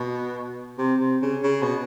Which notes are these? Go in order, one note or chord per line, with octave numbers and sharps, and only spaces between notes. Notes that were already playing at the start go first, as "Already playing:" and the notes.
Already playing: B2
C3
C3
C#3
C#3
B2